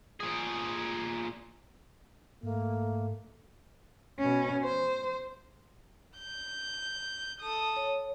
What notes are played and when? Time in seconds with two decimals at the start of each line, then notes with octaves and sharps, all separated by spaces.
0.20 A#2 G#4
2.43 G#2 A3 A#3
4.19 B2 C#4
4.63 C5
6.18 G6
7.40 A4 D#6
7.76 C#5